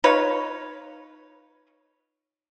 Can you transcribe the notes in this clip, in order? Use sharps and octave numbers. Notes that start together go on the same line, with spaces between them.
D#4 F4 B4 C#5